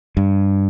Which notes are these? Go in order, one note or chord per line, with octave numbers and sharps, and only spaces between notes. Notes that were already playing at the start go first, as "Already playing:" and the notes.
G2